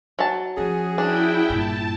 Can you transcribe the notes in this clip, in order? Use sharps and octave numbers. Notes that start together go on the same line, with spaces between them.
F#3 A5
F3 C#4 F#4 G#4
D4 E4 G5
G2 A#2 A5